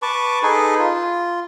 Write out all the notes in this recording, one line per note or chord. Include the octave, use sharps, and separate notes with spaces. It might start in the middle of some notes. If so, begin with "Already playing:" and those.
B4 A5 C#6 D6
D#4 G#4 A4 B4
F4